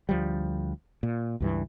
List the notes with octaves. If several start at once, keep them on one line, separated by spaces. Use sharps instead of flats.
D2 F3 G3
A#2
C#2 G2 E3